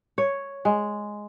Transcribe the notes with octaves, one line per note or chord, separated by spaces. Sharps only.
C#5
G#3